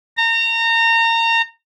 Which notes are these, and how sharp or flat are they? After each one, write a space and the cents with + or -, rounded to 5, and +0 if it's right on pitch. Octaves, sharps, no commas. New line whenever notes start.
A#5 -30